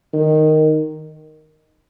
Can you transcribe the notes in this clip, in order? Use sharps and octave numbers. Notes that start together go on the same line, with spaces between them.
D#3